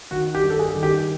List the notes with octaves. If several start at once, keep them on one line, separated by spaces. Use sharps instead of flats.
D#3 F#4
G4
G2
A4
G#4
D#3
G4